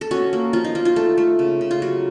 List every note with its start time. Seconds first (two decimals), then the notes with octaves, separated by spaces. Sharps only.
0.01 A4
0.11 C#4 F#4
0.33 A#3
0.53 F3 F4
0.65 D#4
0.75 A#3 F4
0.85 F4
0.96 A3 A4
1.17 A3
1.39 C#3
1.61 C#3
1.71 F4
1.82 F#3 F#4